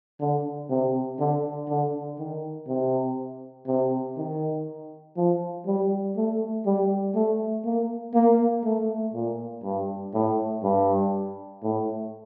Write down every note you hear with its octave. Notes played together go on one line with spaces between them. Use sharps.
D3
C3
D3
D3
D#3
C3
C3
D#3
F3
G3
A3
G3
A3
A#3
A#3
A3
A#2
G2
A2
G2
A2